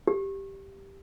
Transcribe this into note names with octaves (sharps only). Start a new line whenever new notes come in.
G4